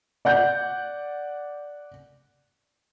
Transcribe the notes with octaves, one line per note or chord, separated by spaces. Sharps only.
D5 F#5 G6